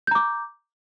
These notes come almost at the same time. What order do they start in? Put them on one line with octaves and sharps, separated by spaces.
G6 A#5 D6